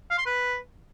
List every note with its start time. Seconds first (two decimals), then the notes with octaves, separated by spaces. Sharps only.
0.10 F5
0.18 C6
0.26 B4